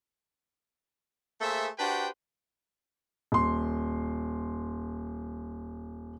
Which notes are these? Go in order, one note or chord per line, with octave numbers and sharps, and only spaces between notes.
A3 A#3 G#4 A4 C5 E5
D4 F#4 G4 B4 C5 G5
D#1 C6